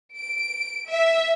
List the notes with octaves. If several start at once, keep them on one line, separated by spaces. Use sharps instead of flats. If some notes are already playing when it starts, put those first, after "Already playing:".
D7
E5